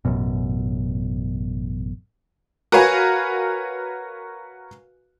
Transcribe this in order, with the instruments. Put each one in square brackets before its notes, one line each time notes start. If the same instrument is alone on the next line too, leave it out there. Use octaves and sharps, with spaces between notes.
[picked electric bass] A1 F#2 B2
[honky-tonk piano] F#4 A#4 B4 C#5 F5 G#5